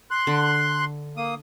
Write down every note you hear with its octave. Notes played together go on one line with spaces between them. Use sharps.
C6 F#6
D3
A#3 D#6